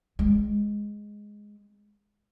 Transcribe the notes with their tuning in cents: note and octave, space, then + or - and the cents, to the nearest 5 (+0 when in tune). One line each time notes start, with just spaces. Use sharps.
G#3 +0 C4 +0